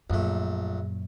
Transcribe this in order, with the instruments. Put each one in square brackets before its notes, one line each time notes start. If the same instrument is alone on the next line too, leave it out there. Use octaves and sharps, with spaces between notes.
[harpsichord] A#1 A3 [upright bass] F#2 A#2